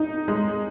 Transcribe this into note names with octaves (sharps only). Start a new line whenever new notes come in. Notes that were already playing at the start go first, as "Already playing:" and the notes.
Already playing: D#4
G#3